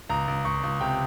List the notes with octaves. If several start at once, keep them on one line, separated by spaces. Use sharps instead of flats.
C#2 A#5
C#2
C#2 C#6
C#2
C3 G5